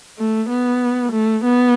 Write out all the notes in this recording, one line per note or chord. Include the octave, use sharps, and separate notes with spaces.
A3
B3
A3
B3